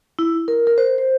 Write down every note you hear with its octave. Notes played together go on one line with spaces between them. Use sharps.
E4
A#4
A#4
C5
C5